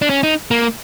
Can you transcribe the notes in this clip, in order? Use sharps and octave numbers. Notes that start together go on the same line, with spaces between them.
D4
C#4
D#4
A#3